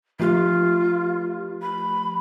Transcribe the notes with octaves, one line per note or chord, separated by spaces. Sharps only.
F3 A3 F4 G4
B5